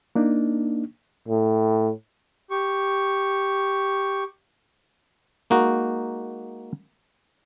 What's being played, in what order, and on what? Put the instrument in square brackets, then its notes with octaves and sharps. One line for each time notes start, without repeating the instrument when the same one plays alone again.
[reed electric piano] A#3 D4 D#4
[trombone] A2
[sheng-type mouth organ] G4 C#6
[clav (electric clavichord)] G#3 A#3 D#4 F#4